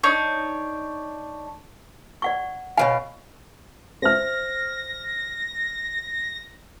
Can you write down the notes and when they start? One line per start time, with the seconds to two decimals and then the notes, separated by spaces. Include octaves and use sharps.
0.03 D4 D#4 C#5
2.22 D5 F#5 C#6
2.77 B2 F3 C#5 F5 G#5
4.02 C5 E5 F6 A#6